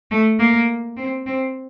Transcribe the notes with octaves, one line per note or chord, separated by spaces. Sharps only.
A3
A#3
C4
C4